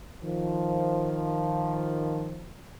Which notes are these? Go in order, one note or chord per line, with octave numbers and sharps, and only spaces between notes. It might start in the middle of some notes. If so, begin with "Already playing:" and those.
D#3 F3